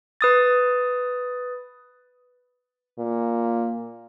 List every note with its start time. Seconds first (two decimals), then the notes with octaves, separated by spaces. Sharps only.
0.21 B4 D#6 A6
2.99 A#2